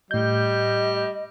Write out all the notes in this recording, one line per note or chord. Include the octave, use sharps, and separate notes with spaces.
A2 G3 D#5 G6